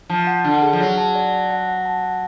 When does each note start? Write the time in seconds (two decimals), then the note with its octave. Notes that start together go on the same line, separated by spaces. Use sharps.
0.09 F3 A5
0.27 F#5
0.44 D3 A5
0.62 G#4
0.73 F3
0.80 F#3 G#4
0.98 A5
1.15 D5
1.33 A5
1.51 F#5
1.68 F#5
1.86 A5
2.03 F#5